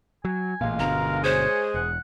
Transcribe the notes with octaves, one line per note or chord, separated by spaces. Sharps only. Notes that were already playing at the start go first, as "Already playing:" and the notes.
F#3 G#5
A1 A#2 G#3 F4 F5
G1 B2 D3 A#4 A#5
G#3 G#4 C5 C#5
E1 F#5